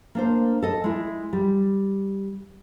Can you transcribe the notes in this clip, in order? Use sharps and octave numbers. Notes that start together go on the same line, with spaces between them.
A#3 D4 C5
A4 D#5
G#3 E4
G3